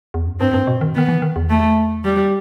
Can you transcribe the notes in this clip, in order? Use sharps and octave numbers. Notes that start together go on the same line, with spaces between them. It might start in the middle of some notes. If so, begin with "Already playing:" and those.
E2
F#2
G2 C4
G2
B2
D#3
D#3 B3
E3
D#3
E2
A3
G3